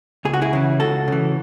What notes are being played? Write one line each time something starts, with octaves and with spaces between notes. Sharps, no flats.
C#2 G#4
F#4
E4 G#4
C#3 E3
C#2 F#4 A4
C#3 E3